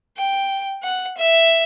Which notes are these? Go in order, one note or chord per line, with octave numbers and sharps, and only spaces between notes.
G5
F#5
E5